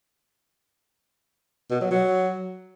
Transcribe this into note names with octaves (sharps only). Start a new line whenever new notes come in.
B2
F#3
F#3